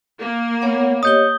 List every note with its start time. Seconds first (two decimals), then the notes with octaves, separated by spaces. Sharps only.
0.21 A#3
0.62 B3 C#5 F#5
1.03 G4 C#5 D#5 D#6 G6 G7